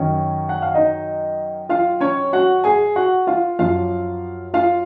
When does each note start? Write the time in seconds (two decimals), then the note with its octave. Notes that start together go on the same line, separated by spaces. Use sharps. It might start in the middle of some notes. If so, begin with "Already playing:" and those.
Already playing: F#2 D#3 C#4 C#5
0.49 F#5
0.62 F5
0.74 D#4 D#5
1.69 F4 F5
2.01 C#4 C#5
2.33 F#4 F#5
2.64 G#4 G#5
2.96 F#4 F#5
3.27 F4 F5
3.59 F#2 F3 F4 F5
4.54 F4 F5